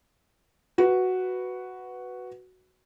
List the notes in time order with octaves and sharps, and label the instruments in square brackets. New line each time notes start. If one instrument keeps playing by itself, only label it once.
[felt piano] F#4 B4